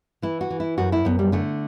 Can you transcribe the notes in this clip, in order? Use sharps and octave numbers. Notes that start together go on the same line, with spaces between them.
E3 E4
F#4
E3
E4
F#2 F#4
E4
F#2 B3
G3
D3 A3